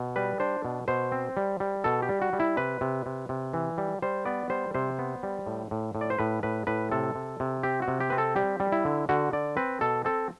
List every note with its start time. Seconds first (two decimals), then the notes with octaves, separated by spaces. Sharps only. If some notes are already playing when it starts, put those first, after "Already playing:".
Already playing: B2
0.16 G3 B4
0.40 D4 C5
0.65 B2
0.88 B2 C5
1.12 C4
1.37 G3
1.60 G3
1.84 B2 A4
2.02 G4
2.09 G3
2.22 F#4
2.33 G3
2.40 E4
2.57 C3 B4
2.81 C3
3.06 C3
3.29 C3
3.54 E3
3.78 G3
4.02 G3 C5
4.25 B3 D5
4.50 G3 C5
4.74 C3 C5
4.99 B3
5.23 G3
5.46 A2
5.71 A2
5.95 A2
6.01 D5
6.10 C5
6.18 A2 B4
6.43 A2 B4
6.67 A2 B4
6.92 C3 A4
7.15 C3
7.40 C3
7.63 C4 G4
7.82 F#4
7.88 C3
8.00 G4
8.10 C4 B4
8.18 A4
8.36 G3 G4
8.60 G3
8.72 E4
8.85 D3
9.09 D3 F#4
9.33 D3 D5
9.57 C4 B4
9.81 B2 A4
10.05 C4 A4